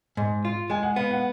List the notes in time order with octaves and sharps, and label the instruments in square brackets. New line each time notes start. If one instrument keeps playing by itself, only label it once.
[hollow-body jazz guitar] G#2
F4
[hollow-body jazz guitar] G#3 [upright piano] G#5
[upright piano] F#5
[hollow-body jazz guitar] B3 [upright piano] F5
[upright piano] F#5